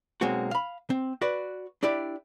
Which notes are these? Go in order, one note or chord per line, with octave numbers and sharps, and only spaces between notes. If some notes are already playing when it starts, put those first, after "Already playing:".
B1 G#3 A#3 C4 F#4
F5 B5
C4
F#4 B4 D5
D4 E4 G4 D5